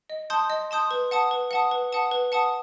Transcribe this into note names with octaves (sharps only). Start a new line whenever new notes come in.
D#5
A5 C6 D#6 G6
D#5
A5 C6 D#6 G6
B4
F#5 A5 D#6
B4
F#5 A5 D#6
B4
F#5 A5 D#6
B4
F#5 A5 D#6